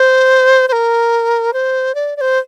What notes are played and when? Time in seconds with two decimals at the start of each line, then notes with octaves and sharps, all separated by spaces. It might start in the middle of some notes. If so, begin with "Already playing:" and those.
Already playing: C5
0.68 C5
0.72 A#4
1.53 C5
1.95 D5
2.17 D5
2.21 C5